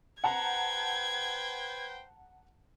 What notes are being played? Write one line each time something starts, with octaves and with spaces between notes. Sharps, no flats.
B4 C5 F#5 G5 A5 A#5 G#6